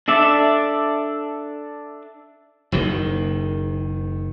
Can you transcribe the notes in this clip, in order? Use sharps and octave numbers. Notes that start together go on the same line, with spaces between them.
D4 A4 D5 E5
F#1 D#3